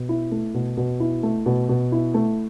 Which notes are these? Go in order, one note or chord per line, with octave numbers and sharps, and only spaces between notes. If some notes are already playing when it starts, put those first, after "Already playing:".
Already playing: B2
E4
A3
B2
B2
E4
A3
B2
B2
E4
A3